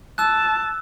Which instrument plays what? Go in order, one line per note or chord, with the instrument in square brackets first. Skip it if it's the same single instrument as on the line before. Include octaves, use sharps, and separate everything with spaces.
[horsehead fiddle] A5 [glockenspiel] E6 F#6